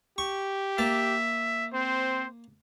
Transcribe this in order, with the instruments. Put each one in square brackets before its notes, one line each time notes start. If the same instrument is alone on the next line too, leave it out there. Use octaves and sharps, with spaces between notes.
[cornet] G4 [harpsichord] C#6
[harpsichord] A#3 A5 [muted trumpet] E5
[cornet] C4 [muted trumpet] C5